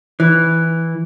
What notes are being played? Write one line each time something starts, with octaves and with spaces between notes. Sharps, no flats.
E3